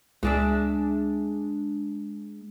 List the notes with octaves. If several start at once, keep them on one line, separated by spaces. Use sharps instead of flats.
C#2 G#3 D4 E5